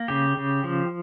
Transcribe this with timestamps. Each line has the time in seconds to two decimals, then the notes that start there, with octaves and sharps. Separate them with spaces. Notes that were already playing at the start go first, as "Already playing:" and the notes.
Already playing: A#3
0.08 C#3 G4
0.37 C#3
0.64 F3